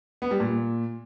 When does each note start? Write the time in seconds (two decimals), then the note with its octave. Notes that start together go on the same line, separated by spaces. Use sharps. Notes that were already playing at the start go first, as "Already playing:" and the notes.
0.22 B3
0.31 G3
0.40 A#2